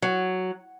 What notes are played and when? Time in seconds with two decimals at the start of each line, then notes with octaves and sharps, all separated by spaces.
0.02 F#3